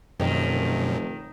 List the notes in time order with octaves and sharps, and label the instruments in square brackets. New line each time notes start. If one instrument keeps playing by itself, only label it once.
[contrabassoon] F1 [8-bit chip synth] F#2 [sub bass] B2 [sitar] D#3